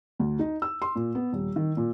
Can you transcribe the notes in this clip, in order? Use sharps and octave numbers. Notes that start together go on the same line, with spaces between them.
D2
D#4
E6
C6
A#2
B3
D#1
D#3
A#2